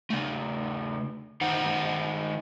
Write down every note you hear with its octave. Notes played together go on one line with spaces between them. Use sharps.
C#3 A3
D#3 D#4 C5 F#5